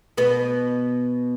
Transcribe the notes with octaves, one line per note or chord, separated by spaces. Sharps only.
B2 B3